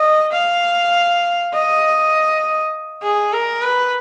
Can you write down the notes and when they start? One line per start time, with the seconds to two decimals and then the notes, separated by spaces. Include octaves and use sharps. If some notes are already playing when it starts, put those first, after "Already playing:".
Already playing: D#5
0.33 F5
1.53 D#5
3.02 G#4
3.32 A#4
3.62 B4